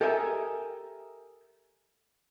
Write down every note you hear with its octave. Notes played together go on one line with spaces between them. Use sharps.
G4 A4 A#4 D#5 E5 G#5